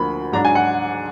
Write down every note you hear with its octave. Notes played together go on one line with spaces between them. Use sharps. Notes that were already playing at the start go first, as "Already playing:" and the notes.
Already playing: D2 D3 F3 A#3 B5
G#2 F#3 D4 A#5
G#5
F#5